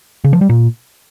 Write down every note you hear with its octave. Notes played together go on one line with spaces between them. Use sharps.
C#3
F3
G3
A#2